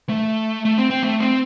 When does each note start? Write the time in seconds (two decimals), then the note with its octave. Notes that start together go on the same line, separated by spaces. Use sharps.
0.09 A3
0.65 A3
0.78 C4
0.90 C4
1.03 A3
1.20 C4